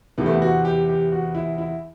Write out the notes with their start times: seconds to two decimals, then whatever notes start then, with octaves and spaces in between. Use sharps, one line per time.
0.18 E2 C3 E3 B3
0.26 A3
0.33 B3
0.42 F#4
0.65 G4
0.89 G4
1.12 F#4
1.35 E4
1.58 E4